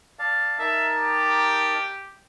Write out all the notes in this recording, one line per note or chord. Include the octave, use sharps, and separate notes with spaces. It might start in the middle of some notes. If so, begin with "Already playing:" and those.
D5 F5 A5
D#4 A#4 E5 A5
G4